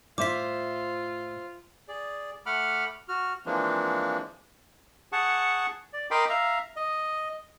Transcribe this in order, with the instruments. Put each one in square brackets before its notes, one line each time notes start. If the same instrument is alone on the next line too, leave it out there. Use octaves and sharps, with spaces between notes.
[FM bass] A2 [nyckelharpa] F4 [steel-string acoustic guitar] C5 E5 [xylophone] D6 B6
[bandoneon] G#4 D5
A3 F#5 B5 D6 F6
F#4 F6
E3 F3 G#3 A#3 C4 D4
[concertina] G#4 F#5 A5 C#6
D5
A#4 D#5 G5 B5 C6 D6
E5 F5 A#5
D#5